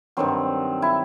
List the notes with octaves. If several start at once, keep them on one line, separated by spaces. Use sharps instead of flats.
G2 D#3 F#3 C4
E4